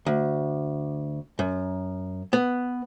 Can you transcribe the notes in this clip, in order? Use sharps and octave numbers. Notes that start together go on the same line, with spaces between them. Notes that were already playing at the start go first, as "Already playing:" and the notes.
D2
F#2
B3